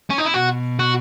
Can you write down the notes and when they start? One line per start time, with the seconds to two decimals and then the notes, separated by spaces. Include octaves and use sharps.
0.10 C#4
0.18 D#4
0.25 E4
0.33 B2 F#4
0.79 F#4